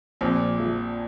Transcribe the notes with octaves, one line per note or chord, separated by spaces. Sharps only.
A#1 A#2 C4
F3